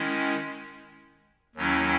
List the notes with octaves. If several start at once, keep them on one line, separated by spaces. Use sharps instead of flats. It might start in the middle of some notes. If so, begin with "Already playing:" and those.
Already playing: D#3 G#3 C#4 E4
D#2 D#3 F#3 C#4 E4